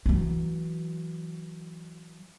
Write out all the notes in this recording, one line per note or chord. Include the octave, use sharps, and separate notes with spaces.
E3 F#3